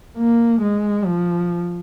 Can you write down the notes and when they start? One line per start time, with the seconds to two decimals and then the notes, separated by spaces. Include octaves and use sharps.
0.18 A#3
0.62 G#3
1.06 F3